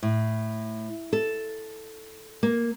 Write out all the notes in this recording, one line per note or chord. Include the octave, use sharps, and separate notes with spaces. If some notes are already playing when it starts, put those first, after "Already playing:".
A2
A4
A#3